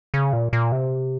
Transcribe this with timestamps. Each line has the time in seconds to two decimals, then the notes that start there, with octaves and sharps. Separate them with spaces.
0.14 C#3
0.33 A#2
0.53 A#2
0.72 C3